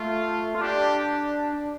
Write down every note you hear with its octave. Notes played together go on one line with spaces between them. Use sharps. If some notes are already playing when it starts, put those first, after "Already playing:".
Already playing: A3 F4
F4
D4 G4